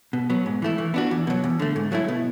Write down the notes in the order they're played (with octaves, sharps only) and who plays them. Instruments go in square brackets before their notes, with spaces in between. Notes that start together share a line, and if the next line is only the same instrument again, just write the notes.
[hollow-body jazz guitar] B2
F#3 B3
G#2
E3 A3 E4
E3
B3 D4 F#4
E2
B2 F#3
E2
D3 A3
G#2
F#3 A3 E4
B2